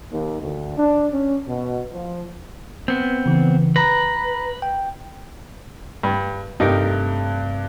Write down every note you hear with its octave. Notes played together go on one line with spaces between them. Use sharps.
D#2
D2
D4
C#4
B2
F3
B3 C4
C#3 E3
B4 A#5 B5 A#6
G5
G2
G2 C3 A3 D#4 G4 A#4